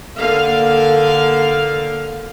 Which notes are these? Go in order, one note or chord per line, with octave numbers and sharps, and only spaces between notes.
D3 A#3 F5